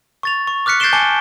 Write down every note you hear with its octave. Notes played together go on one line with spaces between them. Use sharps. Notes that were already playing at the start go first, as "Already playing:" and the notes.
C#6 A6 F7
C#6
D6 F6 F#6 B6 C#7
G6 A6 C7 D7 E7 G7
G#5 A5 D6 C#7 G7